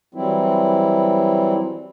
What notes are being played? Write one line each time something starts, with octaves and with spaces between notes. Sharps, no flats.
E3 F#3 G3 C4 E4